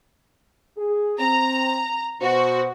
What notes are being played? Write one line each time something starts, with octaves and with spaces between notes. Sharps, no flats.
G#4
C4 A#5
B2 F#4 C5